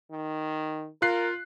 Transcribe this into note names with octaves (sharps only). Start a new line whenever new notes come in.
D#3
F4 A#4 F#6 C7